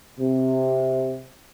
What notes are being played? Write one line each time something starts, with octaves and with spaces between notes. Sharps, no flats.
C3